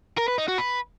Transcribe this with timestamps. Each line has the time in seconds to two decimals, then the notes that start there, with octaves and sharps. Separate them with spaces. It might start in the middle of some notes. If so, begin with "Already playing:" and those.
0.18 A#4
0.28 B4
0.38 D#4
0.48 F#4
0.58 B4